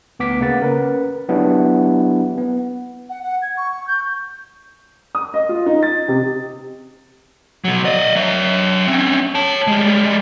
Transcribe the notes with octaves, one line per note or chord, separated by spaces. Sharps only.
D2 B3 D6 B6
C#3 A#3 B4 F#5 A6
C#4 A#4 B4
F#3 B3 D4 E4 G4
B3
F#5
F#5
G#6
C#6
G6
D#6
D#5
F4
D#4
A6
C3
B2 F#3
D5 D#5
F#3 E5
C4 C#4
C#5 A5
G3 G#3